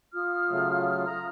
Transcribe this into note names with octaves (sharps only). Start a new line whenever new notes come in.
F4 D#6 F6
C#3 F#3 A3
A#5